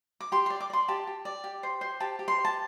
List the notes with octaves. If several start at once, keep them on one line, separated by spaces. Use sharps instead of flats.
D6
G4 C6
C6
D5
D6
D5 C6
G4 A5
G4
D5
G4
C5
C5
G4 A5
G4
C6
C5
A5